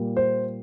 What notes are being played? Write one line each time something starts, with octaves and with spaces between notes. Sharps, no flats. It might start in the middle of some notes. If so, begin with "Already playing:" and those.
Already playing: A#2 G3 A#3
C5